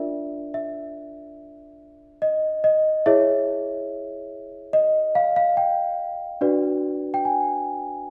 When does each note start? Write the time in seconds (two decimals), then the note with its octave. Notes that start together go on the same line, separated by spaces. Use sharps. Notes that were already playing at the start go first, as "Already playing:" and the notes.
Already playing: D4 F4 A#4 D5 E5
0.54 E5
2.22 D#5
2.64 D#5
3.06 E4 G#4 C#5 E5
4.73 D#5
5.15 F5
5.36 F5
5.57 G5
6.41 D4 F#4 B4 D5
7.14 G5
7.25 G#5